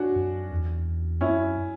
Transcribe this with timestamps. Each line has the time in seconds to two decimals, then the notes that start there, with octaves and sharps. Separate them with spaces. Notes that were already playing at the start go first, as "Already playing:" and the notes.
Already playing: C#4 D4 F#4
0.16 F#2
0.52 E2
1.21 F#2 C#4 E4